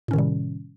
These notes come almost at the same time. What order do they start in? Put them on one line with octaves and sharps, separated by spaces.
A2 C#4 D#3 C3 G3